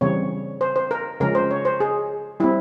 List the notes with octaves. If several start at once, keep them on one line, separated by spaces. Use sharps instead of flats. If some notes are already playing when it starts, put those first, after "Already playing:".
C#3 E3 G3 C4 C#5
C5
C5
A#4
C#3 F3 G#3 C#4 A#4
C5
C#5
C5
G#4
G3 C4 E4